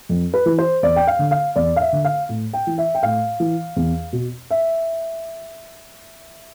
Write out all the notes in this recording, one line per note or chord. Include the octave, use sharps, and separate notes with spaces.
F2
B4
E3
C5
E2 D5
G5
F5
D3
F5
E2 D5
F5
E5
D3
F5
A2
G5
E3
E5
G5
A2 F5
E3
E2
B2
E5